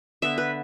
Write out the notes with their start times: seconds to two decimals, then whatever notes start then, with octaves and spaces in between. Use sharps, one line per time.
0.22 D3 B3 E5
0.38 B4